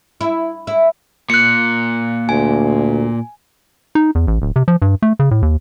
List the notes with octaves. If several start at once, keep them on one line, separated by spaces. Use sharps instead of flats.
E4
E4
A#2 F#6 C#7
D2 G#5
D#4
E2
A1
D1
C3
F3
G2
A3
C#3
A2
D#2